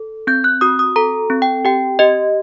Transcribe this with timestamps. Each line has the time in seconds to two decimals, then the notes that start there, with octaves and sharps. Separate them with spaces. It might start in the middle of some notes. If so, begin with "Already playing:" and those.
Already playing: A4
0.27 C4 G6
0.44 F#6
0.61 F#4 D#6
0.79 D#6
0.96 A4 A#5
1.30 C4
1.42 G5
1.65 G4 G5
1.99 G4 D#5